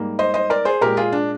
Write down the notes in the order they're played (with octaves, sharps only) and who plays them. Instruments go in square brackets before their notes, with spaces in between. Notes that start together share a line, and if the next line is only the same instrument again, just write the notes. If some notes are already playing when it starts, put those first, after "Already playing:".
Already playing: [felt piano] G#2 G3 A#3
C5 D#5
C5 D#5
A#4 D5
G#4 C5
A#2 G#3 G4 A#4
F4 G#4
D4